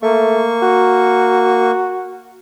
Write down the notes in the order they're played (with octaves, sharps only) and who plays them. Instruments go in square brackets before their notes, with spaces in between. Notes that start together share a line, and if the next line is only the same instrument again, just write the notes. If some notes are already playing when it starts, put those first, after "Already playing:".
[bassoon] A3 [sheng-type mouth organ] A#3 C#6
[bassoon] F#4